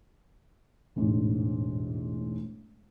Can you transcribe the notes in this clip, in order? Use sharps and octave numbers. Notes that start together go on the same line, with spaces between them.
E1 A1 G#2